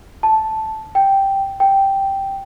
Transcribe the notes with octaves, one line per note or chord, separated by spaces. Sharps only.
A5
G5
G5